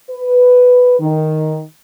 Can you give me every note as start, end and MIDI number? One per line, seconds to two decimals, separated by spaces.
0.10 0.95 71
1.00 1.60 51